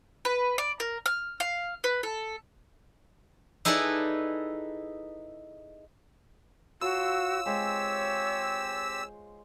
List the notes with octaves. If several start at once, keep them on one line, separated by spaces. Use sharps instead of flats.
B4
D5
A#4
F6
F5
B4
A4
D#4 E4 G#4 A4 B4 D5
F4 F#4 A4 C#5 C6 E6
G#3 C4 G4 C5 C#5